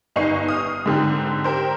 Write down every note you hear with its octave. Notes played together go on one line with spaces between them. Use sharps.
G1 D#4 C#6 C7
D#6 F6
G#2 D3 C4
G4 A#4 C5